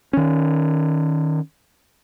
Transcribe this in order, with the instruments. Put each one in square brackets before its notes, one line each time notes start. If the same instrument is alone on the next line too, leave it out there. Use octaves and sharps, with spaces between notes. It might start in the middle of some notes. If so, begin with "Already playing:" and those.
[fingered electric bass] D#3 C#4